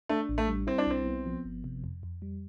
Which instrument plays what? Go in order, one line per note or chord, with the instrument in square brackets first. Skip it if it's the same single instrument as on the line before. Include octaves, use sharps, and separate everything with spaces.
[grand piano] A3 [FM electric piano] D4
[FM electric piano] A1
[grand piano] A3
[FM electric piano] G3
[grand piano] C4 [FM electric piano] E4
[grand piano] D4
[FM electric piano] B1 [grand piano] C4
[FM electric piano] B3
F3
G1
C3
F2
F2
G3